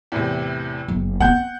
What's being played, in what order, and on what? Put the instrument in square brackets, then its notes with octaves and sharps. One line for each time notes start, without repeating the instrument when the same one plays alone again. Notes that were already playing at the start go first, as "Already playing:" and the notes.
[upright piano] E2 A2 C3
[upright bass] F#1
[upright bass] B3 C4 [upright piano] F#5 G6